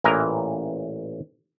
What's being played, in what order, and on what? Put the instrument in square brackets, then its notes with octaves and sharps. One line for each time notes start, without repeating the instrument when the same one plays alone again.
[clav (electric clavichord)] A1 A#2 E3 A#4 D#5 A#5